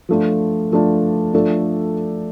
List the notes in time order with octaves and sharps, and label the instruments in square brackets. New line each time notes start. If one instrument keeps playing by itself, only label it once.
[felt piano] F3 A3 D4 F4
F3 A3 D4 F4
F3 A3 D4 A4